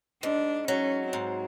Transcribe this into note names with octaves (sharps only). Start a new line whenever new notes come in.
G#2 D4
F#3 C#4
G#2 C4